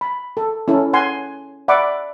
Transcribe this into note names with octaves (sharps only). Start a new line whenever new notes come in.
B5
A4
C#4 E4 A4
F#5 G#5 C6
D5 E5 F#5 B5 C#6 D6